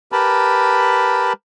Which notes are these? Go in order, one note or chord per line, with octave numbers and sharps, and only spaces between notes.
G4 A#4 B4 A5 B5